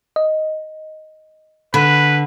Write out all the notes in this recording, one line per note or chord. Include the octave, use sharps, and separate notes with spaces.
D#5
D3 B4 B5